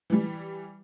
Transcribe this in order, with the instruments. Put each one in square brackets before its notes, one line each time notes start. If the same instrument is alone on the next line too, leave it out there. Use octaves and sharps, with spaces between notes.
[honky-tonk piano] E3 G3